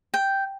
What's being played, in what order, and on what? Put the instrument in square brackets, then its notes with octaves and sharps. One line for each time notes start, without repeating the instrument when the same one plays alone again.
[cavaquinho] G5